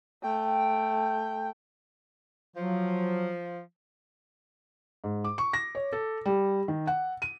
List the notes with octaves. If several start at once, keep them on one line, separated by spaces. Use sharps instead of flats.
A3 G5
F3 F#3
G#2
D6
C#6
A#6
C#5
A4
G3
D#3
F#5
D#7